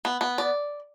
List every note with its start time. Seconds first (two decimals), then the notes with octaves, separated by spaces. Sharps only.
0.05 B3
0.21 B3
0.38 D5